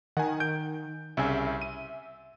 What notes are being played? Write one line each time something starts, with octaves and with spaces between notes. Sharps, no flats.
D#3 F#5 G#5
G6 D7
C2 C#3 E5 G#5
D#7